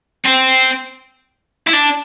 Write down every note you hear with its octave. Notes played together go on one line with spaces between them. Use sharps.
C4
E4
D4